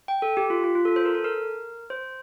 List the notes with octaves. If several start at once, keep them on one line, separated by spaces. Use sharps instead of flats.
G5
A4
G4
F4
F4
F4
A4
C5
A#4
A4
A#4
C5